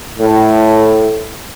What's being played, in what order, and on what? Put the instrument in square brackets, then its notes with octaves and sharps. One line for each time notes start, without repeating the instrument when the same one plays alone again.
[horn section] A2